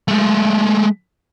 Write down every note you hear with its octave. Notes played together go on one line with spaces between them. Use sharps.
G#3 A3